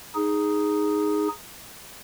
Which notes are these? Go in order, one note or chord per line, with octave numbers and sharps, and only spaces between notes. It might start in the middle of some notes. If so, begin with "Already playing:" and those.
D#4 G#4